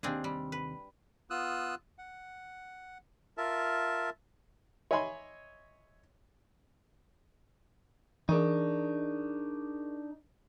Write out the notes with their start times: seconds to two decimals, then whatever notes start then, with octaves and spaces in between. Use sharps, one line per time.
0.03 D#2 C3 C4 D4 G#4
0.24 G3
0.52 B4
1.30 B3 F4 D#6 E6 F#6
1.98 F#5
3.37 F4 A#4 E5 A5
4.91 C#5 D#5 E5 G#5 B5 C6
8.29 E3 D4 D#4 G#4 A#4 C#6